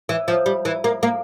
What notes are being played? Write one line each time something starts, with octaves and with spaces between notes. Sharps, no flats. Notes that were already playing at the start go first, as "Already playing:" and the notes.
E3
F3
G3
E3
A#3
A#3